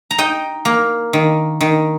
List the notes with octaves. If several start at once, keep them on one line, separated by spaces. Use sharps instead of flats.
A#5
D#4 D#5 G5
A#3
D#3
D#3